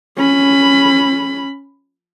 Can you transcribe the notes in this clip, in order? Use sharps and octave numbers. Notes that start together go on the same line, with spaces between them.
C#4 B5